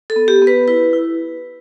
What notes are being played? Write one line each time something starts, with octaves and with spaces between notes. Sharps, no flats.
A4
B3
G4
B3
B4
E4 B4
E4